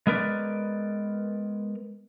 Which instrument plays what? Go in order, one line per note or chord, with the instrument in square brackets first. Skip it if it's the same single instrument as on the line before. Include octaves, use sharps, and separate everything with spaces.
[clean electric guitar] G#3 B3 A#4 B4 D5